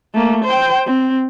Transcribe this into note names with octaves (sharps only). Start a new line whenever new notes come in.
A3 A#3
C5 G5
C4